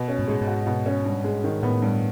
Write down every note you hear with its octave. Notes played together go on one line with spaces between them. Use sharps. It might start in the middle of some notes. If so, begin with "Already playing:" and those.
Already playing: B2
C#4
G#2
A2 G#3
G#2
F#4
B2
C#4
G2
G#3
D#3
A2 B3
G2